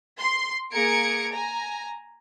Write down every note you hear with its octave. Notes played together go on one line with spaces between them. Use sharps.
C6
A#3 G#4 A#5 G#6 C#7 D7
G#5 A#5